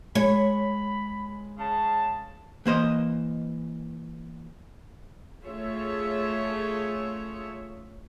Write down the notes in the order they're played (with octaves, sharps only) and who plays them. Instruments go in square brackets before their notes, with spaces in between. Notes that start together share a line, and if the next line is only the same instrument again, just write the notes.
[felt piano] G#3 [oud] C#5 [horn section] B5
[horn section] C#3 A5
[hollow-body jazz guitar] E3 A#3 C5 D#5
[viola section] A3 C#4 F4 G#4 C#5 E5